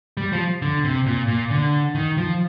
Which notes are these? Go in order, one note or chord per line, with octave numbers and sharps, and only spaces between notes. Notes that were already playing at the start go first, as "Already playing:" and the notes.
G3
F3
D3
C3
A#2
A#2
D3
D#3
F3